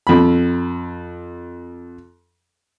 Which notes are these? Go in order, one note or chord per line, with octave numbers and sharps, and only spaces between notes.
F2 B5